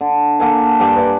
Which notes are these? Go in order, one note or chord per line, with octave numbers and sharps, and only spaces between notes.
D3
A#3 A4 F#5 G#5
G2 D4 G5 D6
B4 D5 G#5